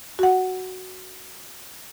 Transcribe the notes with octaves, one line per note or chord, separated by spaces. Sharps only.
F#4 F#5